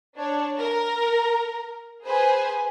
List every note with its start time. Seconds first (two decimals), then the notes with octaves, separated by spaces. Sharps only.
0.17 D4 C#5
0.60 A#4
2.05 G#4 B4 C5 G#5